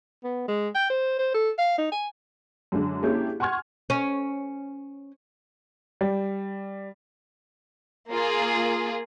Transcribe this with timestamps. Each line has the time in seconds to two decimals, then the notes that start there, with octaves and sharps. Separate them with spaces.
0.24 B3
0.48 G#3
0.75 G5
0.90 C5
1.19 C5
1.34 A4
1.58 F5
1.78 D#4
1.92 G#5
2.72 F#2 D3 G#3 D4
3.03 A#3 C#4 D4 E4 G4 G#4
3.40 F#5 G#5 C6 C#6 F6 G#6
3.90 C#4
6.01 G3
8.10 A#3 F4 G#4